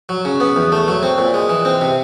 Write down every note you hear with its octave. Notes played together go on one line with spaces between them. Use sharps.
F#3
C#3
B3
E2
A3
F#3
C4
A#2
G#3
E3
C4
C3